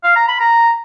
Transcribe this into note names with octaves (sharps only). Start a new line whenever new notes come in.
F5
A#5
B5
A#5